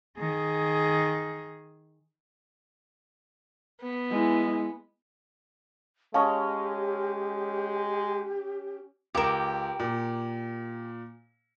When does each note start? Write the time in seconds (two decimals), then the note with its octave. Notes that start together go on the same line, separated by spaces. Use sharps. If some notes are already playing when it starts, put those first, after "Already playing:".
0.18 D#3 G#4
3.81 B3
4.11 G#3 E4
6.14 G#3 C#4 G4 C#5 D#5 F5 A5 C#6
9.15 C#2 G4 A#4 D6 E7
9.80 A#2